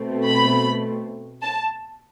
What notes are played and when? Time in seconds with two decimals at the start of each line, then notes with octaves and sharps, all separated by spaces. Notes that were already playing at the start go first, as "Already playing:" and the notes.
Already playing: B2 A3 C4
0.26 B5
1.43 A5